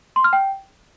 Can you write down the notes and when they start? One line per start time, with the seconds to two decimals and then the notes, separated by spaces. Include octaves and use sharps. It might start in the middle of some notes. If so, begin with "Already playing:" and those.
0.16 C6
0.24 F6
0.33 G5